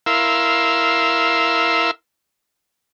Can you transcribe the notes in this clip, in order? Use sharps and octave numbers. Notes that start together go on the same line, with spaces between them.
E4 A#4 F5 C6 E6